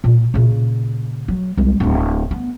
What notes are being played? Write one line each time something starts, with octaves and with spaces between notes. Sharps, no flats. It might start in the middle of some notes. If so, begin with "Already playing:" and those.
A#2 D#4
A#2 C#3
F#3
C2 G#3
D1 D4
B3